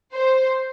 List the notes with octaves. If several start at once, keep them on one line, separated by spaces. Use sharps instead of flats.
C5